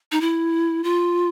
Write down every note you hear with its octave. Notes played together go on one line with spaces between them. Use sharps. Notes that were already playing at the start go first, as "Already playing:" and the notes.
D#4
E4
F4